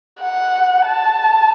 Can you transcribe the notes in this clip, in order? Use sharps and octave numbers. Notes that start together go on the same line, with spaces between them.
F#5
A5